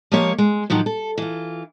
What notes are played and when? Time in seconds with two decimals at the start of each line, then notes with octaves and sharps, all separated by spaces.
0.12 F3 G#3 A#3 G4 C#5
0.38 G#3
0.70 A2 D#3 F3 F#3 G4
0.86 A4
1.18 E3 F4